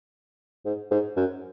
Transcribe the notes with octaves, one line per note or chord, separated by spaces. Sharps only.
G#2
G#2
F#2